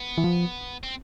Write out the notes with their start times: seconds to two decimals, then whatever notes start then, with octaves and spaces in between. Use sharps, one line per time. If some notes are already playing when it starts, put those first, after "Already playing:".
Already playing: B3
0.18 E3
0.24 F3
0.83 C4